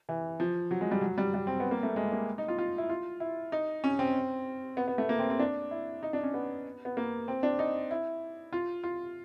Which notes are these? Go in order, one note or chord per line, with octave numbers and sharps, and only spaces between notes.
E3
F3
F#3
G#3
G3
F#3
G3
G3
C4
B3
A#3
A3
G#3
A#3
D#4
F4
F4
E4
F4
E4
D#4
C#4
C4
B3
B3
A3
A#3
C4
C4
D4
E4
D#4
D4
C#4
B3
B3
A#3
C4
D4
D#4
E4
F4
F4